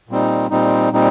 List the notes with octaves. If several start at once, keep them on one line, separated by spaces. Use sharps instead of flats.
A#2 G3 C4 D#4
A#2 G3 C4 D#4
A#2 G3 C4 D#4